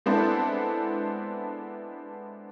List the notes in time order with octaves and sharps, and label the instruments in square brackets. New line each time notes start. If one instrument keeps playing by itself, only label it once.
[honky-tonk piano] G#3 B3 C4 D4 E4 A4